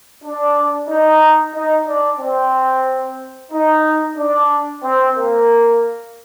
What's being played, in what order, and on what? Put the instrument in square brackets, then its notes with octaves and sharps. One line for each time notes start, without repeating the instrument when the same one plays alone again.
[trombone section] D4
D#4
D#4
D4
C4
D#4
D4
C4
A#3